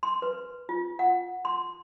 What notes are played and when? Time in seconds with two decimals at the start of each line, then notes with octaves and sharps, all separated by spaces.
0.03 C6
0.22 B4
0.69 F4
0.99 F#5
1.45 C6